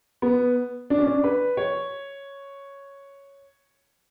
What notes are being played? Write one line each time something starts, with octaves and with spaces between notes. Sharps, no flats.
B3
D4
C#4
D4
B4
C#5